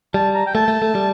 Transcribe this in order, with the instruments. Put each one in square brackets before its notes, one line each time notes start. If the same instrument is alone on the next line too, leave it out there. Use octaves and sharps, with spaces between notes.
[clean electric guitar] G3 [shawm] A5
[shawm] A#5
G5
[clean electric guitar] A3 [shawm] A5
[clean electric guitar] A3
A3
G3